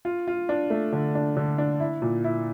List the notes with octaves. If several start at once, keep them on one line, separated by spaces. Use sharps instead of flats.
F4
F4
D4
A3
D3
D4
D3
D4
E4
A#2
E4